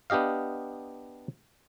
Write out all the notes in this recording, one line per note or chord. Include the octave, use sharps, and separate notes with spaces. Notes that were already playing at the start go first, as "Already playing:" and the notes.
B3 D4 G4 D#5 F5